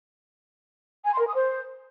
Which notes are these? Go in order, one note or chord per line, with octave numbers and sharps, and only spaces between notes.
G#5
C6
A#4
D#6
C5